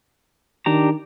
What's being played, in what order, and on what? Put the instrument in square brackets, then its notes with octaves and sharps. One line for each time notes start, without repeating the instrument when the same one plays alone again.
[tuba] D#3 [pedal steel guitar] D4 G4 A#5